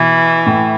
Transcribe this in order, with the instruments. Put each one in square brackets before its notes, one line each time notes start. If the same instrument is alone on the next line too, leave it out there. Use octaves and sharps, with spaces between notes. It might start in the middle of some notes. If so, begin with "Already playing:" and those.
Already playing: [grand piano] B2 [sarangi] E3
[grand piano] A2